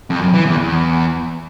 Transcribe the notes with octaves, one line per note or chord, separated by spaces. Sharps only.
F2
F#2
E3
E2
E2